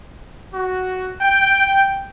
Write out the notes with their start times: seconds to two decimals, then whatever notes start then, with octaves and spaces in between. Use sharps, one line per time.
0.54 F#4
1.21 G5